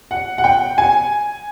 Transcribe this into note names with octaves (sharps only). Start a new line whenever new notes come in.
F#5
F#5
G5
G#5